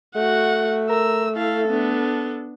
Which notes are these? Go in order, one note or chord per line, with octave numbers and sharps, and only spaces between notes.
A3 F#4 F#5
A#4 E6
E4 A4 F5
B3 D4